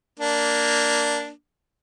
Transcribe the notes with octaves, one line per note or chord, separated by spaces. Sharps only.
A#3 D4